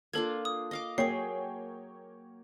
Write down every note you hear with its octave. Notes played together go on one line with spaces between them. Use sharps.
A#3 D4 F4 A4 G#6
D#6
D#5 F5 D6
F#3 A#3 G#4 C#5 G5 C7